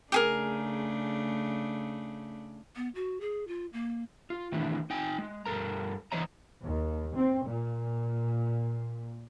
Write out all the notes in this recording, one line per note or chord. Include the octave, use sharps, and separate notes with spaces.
C#3 A3 D4 G4 G#4 A#4
B3
F#4
G#4
F4
A#3
F4
D#3 E3 A3 D4 E4
D#4 G5 G#5
G#3
G2 A4 A#4 A#5
E3 C5 C#5 D#5 A#5
D#2
C4
A#2